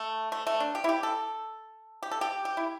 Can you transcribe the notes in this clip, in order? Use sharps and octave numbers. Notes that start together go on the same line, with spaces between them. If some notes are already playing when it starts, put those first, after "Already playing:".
Already playing: A3
A3
A3
D4
G4
E4
G4
A4
G4
A4
G4
G4
E4